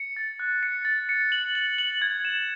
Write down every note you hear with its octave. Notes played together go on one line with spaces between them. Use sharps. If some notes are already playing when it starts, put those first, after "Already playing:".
Already playing: C#7
A6
F#6
C#7
A6
C#7
F#7
F#7
F#7
G#6
E7